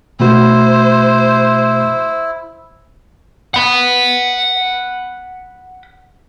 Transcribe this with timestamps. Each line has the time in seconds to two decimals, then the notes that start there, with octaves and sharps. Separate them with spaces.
0.20 B2 A3 E4 F#4 C5
3.54 F#5 B5